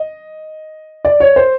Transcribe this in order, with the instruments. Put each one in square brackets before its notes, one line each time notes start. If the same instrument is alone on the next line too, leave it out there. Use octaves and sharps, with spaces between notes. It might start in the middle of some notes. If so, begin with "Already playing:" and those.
Already playing: [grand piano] D#5
D5
C#5
C5